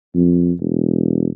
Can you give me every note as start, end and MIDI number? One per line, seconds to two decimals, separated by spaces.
0.15 0.52 41
0.60 1.28 28